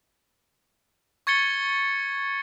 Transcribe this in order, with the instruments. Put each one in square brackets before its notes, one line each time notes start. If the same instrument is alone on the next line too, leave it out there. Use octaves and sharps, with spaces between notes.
[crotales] C#6 G#6 A6 C#7 G7